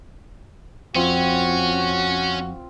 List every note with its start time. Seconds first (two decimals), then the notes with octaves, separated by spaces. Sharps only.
0.95 F2 C4 C#4 F4 F#4